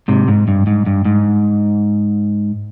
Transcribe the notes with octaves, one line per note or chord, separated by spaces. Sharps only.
G#2 C3
G#2
G2
G#2
G2
G#2